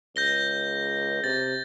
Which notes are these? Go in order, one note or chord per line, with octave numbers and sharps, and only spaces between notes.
C#2 G6 A#6 G7
C3 A6